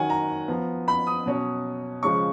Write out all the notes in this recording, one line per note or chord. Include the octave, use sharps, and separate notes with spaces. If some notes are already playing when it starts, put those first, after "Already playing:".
Already playing: D#3 F#3 C#4 F#5 G#5
A#5
F3 B3
B5
D#6
B2 F#3 C#4
C#3 F3 G#3 C#4 C#6